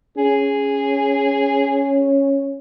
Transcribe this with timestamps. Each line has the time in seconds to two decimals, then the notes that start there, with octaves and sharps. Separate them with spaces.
0.17 C#4 G#4